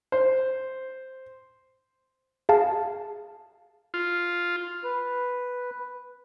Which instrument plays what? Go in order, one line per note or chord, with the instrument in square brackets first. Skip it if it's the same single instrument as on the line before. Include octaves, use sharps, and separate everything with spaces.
[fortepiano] C5
[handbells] G#4 F5 A5
[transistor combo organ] F4
[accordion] B4